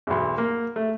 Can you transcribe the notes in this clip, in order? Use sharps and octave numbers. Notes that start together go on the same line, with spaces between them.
B1 E2
A#3
A3